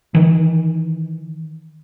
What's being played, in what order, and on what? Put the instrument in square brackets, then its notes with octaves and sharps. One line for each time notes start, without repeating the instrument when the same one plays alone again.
[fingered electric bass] D#3 E3